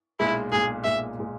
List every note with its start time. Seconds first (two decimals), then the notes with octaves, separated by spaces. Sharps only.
0.20 B1 A#2 G#3 E4
0.52 B1 A#2 G#3 G#4
0.84 B1 A#2 G#3 E5
1.19 A#2 G#3